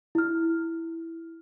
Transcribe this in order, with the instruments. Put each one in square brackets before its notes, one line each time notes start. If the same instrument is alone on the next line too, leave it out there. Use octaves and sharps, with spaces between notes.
[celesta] E4 F6